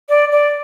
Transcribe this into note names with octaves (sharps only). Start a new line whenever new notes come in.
D5
D5